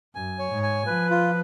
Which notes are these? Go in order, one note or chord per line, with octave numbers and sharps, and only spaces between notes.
F#2 G#5
C#5
G#2
G#5
F3 B4
F4